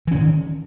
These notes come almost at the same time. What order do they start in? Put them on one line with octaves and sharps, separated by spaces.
E3 C#4 D#3